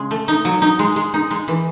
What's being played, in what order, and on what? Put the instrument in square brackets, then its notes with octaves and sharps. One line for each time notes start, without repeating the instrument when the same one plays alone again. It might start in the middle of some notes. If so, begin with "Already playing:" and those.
Already playing: [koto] C#3 G#3
A3
D#4
F#3
D#4
G#3
G#3
D#4
G#3
E3